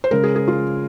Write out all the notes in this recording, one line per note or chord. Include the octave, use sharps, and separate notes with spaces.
C5
C#3 G#3 A#4
G#4
G#4
F4